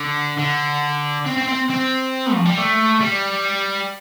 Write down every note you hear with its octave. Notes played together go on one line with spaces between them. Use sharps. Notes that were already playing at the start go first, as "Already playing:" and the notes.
Already playing: D3
D3
C4
C4
C4
C4
F3
G3
A3
G3